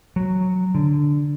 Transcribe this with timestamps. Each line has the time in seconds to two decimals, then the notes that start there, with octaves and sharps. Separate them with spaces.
0.16 F#3
0.75 D3